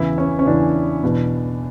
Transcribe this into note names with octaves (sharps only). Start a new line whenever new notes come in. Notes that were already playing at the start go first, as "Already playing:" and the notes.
Already playing: E2 C#3 E3 E4
C#4
C#4
E2 C#3 E3 D4
E2 B2